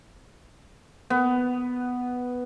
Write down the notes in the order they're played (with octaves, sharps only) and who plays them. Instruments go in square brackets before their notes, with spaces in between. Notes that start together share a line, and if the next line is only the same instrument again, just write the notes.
[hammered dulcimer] B3